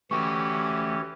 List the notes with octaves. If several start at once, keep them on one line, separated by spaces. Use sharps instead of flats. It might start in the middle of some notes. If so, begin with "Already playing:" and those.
E3 A3 C#4 F#4 G4 C#6